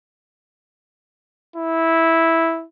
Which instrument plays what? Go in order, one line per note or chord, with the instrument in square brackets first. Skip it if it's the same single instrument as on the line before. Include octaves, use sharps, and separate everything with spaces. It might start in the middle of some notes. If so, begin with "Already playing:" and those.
[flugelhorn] E4